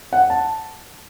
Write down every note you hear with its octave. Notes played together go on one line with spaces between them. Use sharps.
F#5
A5